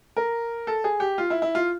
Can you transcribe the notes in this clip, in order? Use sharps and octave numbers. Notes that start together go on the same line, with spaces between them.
A#4
A4
G#4
G4
F4
E4
E4
F4